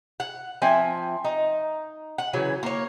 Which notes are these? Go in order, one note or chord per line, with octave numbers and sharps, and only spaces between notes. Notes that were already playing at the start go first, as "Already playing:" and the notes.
F#5
F3 C4 E5 G#5
D#4
F#5
C#3 E3 F#3
A#3 C#5